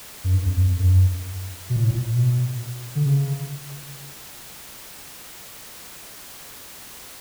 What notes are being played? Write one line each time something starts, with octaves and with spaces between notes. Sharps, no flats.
F#2
G2
F2
F2
F2
F#2
B2
A#2
A2
A#2
B2
D3
C#3